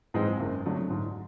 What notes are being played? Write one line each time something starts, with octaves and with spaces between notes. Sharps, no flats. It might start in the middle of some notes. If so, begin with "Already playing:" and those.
G#2 E3 G#3 C4
F#1
F2 D3 F#3 A3
G#2